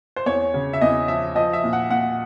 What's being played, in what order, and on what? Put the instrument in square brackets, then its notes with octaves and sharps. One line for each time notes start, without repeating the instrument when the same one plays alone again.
[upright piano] C5
E2 C#5
C#3
E5
E2 D#5
F3 E5
F3 D#5
E5
A#2
F#5
A#2 F#5